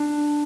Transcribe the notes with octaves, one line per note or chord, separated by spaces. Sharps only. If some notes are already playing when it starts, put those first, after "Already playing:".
Already playing: D4